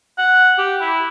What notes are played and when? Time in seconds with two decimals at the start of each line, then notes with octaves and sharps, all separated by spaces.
0.18 F#5
0.58 G4
0.80 E4